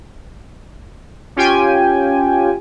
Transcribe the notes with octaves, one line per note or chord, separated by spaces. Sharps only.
C#4 F4 G4 G5 G#5